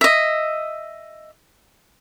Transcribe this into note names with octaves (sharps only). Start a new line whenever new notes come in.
D#5 E5